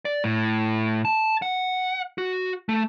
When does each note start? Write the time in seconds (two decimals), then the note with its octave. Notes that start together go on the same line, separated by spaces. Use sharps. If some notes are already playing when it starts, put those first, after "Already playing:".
0.05 D5
0.24 A2
1.05 A5
1.42 F#5
2.18 F#4
2.69 A3